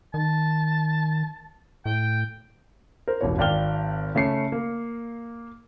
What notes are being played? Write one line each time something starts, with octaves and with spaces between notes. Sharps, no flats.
D#3 A5
A2 G5
A#4 C5
E1 A1 B2 C#5
G#1 D5 F5 G5 F6 G7
C#3 A3 C#4 C7 C#7
A#3